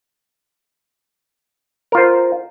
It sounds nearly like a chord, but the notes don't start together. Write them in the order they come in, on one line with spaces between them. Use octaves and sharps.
A#4 F4 C5